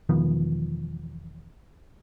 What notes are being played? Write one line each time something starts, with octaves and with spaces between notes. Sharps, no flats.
E1 D#3 F3 B3